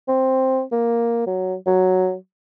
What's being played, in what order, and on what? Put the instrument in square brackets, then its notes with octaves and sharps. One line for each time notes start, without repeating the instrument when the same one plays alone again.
[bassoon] C4
A#3
F#3
F#3